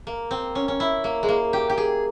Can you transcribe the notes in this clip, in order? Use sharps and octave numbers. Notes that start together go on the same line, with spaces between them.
A#3
C4
C#4
C#4
E4
A#3
G#3
A#3
G4
G4
G#4